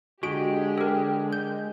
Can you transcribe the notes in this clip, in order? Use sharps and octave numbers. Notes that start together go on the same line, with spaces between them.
D3 G#3 F#4 G4 D7
A4 A#4
G6